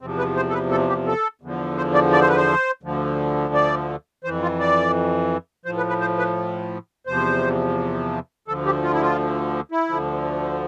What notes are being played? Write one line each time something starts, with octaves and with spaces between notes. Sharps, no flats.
E2 C3 F3 C4
B4
C5
A4
B4
A4
G4
A4
E2 D3 F3
C5
D5
D5
C5
B4
C5
D2 D3 F3
D5
F2 E3 C5
F4
D5
A2 F3 C5
B4
B4
C5
B4
E2 C3 F3 C5
D2 D3 F3 A4
G4
F4
E4
F4
E4
D2 D3 F3